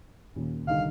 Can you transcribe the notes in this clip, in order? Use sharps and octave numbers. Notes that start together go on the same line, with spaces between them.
D#2 A#2 C#4
C2 D3 D#3 F5